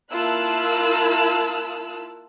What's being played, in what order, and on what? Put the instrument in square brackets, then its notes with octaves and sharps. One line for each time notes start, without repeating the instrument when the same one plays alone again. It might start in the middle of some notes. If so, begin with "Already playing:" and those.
[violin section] A#3 E4 F4 A5 E6 F#6